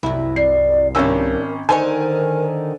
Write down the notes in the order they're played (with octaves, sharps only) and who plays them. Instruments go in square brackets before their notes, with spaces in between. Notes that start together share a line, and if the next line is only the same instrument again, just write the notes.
[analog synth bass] C2 [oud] F#2 E4
[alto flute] D5 [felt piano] C7
[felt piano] G#1 C#4 E6 [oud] D#3 G3 D4 [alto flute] A#4
[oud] D3 C5 C#5 [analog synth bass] D#3 [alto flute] A#4 [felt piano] G#5